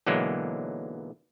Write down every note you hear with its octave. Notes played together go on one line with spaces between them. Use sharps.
B1 D3 E3 F#3 G#3 A#3